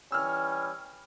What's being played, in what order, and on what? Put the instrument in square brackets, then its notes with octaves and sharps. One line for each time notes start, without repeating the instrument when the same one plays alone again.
[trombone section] E3 G3 C#4 [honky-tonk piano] E6 F6